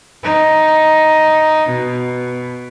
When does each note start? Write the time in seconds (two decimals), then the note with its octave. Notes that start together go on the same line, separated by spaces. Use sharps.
0.23 D#4
1.70 B2